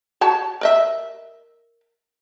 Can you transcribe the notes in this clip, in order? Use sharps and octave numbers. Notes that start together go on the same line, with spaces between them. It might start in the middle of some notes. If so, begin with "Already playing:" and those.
F#4 C#5 A5
A#4 D#5 E5